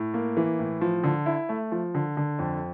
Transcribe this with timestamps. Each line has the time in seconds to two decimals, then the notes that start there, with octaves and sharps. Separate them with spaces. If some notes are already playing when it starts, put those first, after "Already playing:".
Already playing: A2
0.14 A#3
0.37 E3
0.59 A2
0.81 F3
1.04 D3
1.26 E4
1.49 A3
1.72 F3
1.95 D3
2.17 D3
2.39 F2